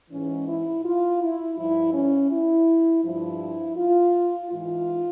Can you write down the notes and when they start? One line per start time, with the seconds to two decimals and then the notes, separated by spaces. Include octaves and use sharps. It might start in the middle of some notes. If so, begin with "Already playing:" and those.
0.11 G#2 E3 C#4
0.47 E4
0.84 F4
1.21 E4
1.58 G2 F3 E4
1.94 C#4
2.31 E4
3.04 G2 F3 E4
3.77 F4
4.51 G#2 E3 F4